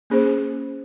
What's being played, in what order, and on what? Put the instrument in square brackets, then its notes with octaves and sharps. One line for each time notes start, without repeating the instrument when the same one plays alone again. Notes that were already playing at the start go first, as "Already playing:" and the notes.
[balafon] A#3 C#4 G#4 C5